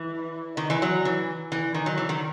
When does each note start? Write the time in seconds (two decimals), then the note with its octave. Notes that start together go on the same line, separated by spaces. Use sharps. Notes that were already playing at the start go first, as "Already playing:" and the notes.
Already playing: E3
0.57 D#3
0.70 E3
0.82 F#3
1.05 E3
1.52 E3
1.74 D#3
1.86 F#3
1.97 E3
2.09 D#3